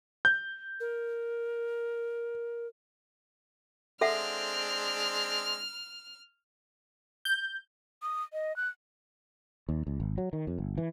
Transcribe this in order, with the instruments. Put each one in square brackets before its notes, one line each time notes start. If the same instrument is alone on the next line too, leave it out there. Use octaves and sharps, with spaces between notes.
[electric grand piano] G6
[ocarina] A#4
[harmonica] G#3 C4 D4 [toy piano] A4 E5 F#5 [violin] F6
[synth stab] G6
[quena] D#6
D#5
F#6
[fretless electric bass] D#2
C#2
G#1
F#3
D#3
F2
G1
E3